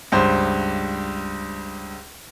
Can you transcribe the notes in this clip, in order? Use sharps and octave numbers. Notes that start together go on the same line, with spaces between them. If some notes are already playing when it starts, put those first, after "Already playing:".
C#2 G2 C5